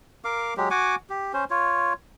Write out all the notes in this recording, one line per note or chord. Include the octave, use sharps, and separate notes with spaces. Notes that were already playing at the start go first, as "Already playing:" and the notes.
A#4 F5 D6
F#3 G#3 G4
F#4 F#5 G#5 D6
G4
C#4 C5
F4 C#5